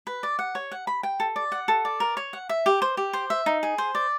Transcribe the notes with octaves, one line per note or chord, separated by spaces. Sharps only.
B4
D5
F#5
C#5
F#5
B5
G5
A4
D5
F#5
A4
D5
A#4
C#5
F#5
E5
G4
C5
G4
C5
E5
D#4
G#4
C5
D5